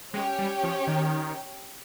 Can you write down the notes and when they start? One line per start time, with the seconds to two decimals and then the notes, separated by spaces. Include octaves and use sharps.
0.14 G#3 C#4 G4 C#5 G5
0.39 G3
0.63 F3
0.87 D#3